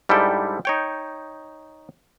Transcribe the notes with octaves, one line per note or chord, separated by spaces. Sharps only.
G#2 G3 D4 E4 A4 G5
D#4 C#5 G5